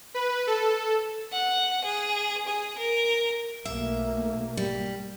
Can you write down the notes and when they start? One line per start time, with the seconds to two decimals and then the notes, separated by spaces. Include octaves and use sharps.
0.14 B4
0.47 A4
1.33 F#5
1.84 G#4
2.46 G#4
2.78 A#4
3.65 B1 A3 A#3 E5
4.57 G3